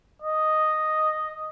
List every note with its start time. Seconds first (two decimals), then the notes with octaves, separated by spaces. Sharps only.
0.22 D#5